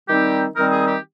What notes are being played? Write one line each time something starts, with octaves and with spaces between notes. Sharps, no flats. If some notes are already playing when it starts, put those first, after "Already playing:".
D#3 G3 C4 D#4 G4
D#3 G3 C4 D#4 A#4
G#4
G4